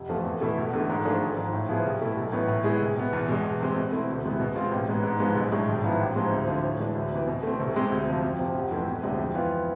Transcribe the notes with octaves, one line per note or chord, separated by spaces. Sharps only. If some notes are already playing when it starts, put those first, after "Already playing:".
Already playing: F1
E2 C3 F3 A3
E2
B2 A3 E4
E1
E2 D3 A3
G#2
F3 A3 D4 G#4
G#1
G#2 F3
A2
F3 B3 E4 G#4
C2
B2 A3 E4
B1
A2 E3 B3
A2
G#3 B3 E4 G#4
C2
B2 B3
E2
B2 G#3
E2
C3 G#3 C4
B2
A3 C4 E4
D2
C3 E3 G#3 B3
B2
G#3 C4 F4
A1
G#2 G#3 B3
G#2
F3 G#3 B3
B1
A2 G#3 D4
G#1
G#2 F3 B3 E4
A1
G#2 F3 G#3 C4
D2
D3 F3
A2
E3 G#3 D4
D2
C3 E3
B2
A3 C4
C2
C3 G#3 C4
D2
C3 F3
F2
C3 F3
F1
F2 E3 A3 C4
E1
D2 C3 G#3 D4
F2
E3 B3 F4